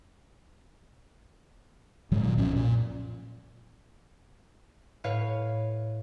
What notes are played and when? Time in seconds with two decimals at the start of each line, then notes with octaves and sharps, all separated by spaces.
2.11 G#2 D#3 F#3 G#3
2.23 A#2
2.37 B1 F#2 F3 C#4
2.56 A#2
5.04 A2 B4 C#5 F5